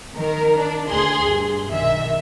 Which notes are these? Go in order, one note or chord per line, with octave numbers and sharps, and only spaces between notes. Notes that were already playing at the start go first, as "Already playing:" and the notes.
D#3 A#4
D4
D2 G#4 C6
G2
B1 D#3 E5